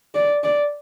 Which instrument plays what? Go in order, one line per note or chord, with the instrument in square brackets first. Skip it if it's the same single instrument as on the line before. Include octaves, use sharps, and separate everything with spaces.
[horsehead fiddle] D5
D5